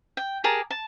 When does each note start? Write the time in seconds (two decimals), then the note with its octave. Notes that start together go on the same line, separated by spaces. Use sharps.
0.17 G5
0.44 G4 G#4 A#4 A5
0.70 A5